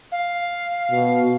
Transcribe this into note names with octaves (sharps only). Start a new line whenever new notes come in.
F5
B2